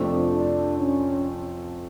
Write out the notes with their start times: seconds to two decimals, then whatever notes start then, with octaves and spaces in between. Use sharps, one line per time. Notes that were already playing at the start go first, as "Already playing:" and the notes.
Already playing: F2 C3 F3 A3 C4 D4
0.30 D4
0.77 C#4